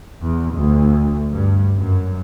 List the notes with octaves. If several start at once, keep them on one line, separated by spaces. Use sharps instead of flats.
E2
D2
G2
F#2